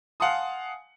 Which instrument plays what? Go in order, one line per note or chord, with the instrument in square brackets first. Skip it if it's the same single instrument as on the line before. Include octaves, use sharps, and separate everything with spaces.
[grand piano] F5 F#5 G#5 A5 C6 D#6